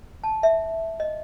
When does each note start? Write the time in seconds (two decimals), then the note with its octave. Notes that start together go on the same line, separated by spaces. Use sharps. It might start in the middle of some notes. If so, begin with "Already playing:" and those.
0.24 A5
0.43 E5
1.00 D#5